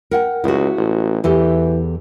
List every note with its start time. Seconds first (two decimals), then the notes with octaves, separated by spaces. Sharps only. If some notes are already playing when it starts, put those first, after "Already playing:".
0.11 A#4 F#5 G5
0.44 C#2 E4 F#4
0.77 A1
1.24 E2 E3 G4 A4